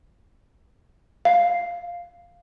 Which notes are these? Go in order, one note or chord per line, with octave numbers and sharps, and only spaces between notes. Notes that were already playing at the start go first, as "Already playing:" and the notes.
F5